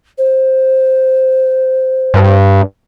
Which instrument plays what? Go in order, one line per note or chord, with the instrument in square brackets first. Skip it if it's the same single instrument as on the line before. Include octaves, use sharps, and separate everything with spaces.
[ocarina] C5
[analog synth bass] G2